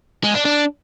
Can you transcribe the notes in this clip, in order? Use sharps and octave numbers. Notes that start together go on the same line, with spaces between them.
G#3
D4
D4